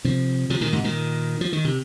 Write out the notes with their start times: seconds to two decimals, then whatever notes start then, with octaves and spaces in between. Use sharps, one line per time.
0.05 C3 F3
0.50 C3 F3
0.61 A#2 D#3
0.73 G#2 C3
0.84 A#2 D#3
1.41 F3
1.53 D#3
1.65 C3